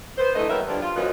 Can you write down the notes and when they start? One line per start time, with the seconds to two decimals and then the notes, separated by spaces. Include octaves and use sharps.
0.18 B3 C5
0.36 D3 E3 A3 D#4 A4 D#5
0.49 G3 A#3 B3 A#4 C#5 E5
0.68 G2 D3 F3 D4 F4
0.82 F4
0.96 F#2 A#2 F3 D#4 F4 B4